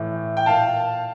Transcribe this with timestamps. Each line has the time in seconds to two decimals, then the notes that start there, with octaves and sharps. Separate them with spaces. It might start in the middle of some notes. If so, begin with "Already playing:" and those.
Already playing: A2 E3
0.37 G5
0.46 A#2 F5 A5